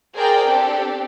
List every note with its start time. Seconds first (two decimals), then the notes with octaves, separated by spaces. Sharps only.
0.15 G#4 A#4 C5 D5 G5
0.47 C4 D4 G4 A4